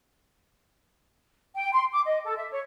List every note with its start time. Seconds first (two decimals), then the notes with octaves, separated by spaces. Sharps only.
1.55 G5
1.72 C6
1.91 D6
2.06 D#5
2.24 A4
2.37 E5
2.51 C#5